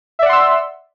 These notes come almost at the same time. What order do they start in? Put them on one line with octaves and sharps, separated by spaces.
E5 D5 F#5 C6 E6